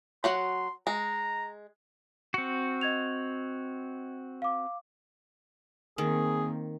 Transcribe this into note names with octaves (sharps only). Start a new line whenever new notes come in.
F#3 F#4 F#5 C6
G#3 A#5
C4 F#4 C#7
D#5 G#6 F7
F5 D6
D#3 A#3 C4 G#4